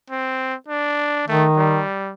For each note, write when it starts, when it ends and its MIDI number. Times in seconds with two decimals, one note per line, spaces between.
0.10 0.54 60
0.69 1.23 62
1.28 1.82 51
1.28 1.46 57
1.57 2.13 55